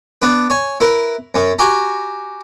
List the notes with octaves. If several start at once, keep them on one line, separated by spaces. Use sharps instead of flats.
B3 D4 B4
C#5 G#5
E4 A#4 B4
F#2 C#4
F#4 G4 G#5 A#5